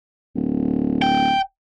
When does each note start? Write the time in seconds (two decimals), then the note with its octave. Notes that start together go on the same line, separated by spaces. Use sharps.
0.36 D1
1.02 G5